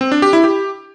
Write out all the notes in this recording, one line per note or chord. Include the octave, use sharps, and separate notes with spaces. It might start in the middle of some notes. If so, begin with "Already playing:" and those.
C4
D4
G4
E4
G4